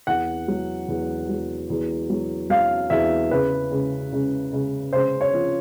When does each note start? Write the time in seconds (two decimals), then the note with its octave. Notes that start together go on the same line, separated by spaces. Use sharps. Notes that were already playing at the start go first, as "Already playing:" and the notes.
0.07 E2 F#5
0.48 F#3
0.88 E2
1.29 F#3
1.70 E2
2.10 F#3
2.50 F#3 F5
2.90 E2 E5
3.31 C#3 B4
3.71 C#3
4.12 C#3
4.53 C#3
4.93 C#3 C5
5.21 C#5
5.34 F3